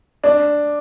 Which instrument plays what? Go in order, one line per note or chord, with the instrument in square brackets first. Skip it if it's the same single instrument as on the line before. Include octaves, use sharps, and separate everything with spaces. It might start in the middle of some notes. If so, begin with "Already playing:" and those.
[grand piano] D4